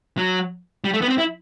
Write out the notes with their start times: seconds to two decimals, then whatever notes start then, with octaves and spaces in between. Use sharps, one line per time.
0.18 F#3
0.84 G3
0.93 A3
1.02 B3
1.09 C4
1.18 E4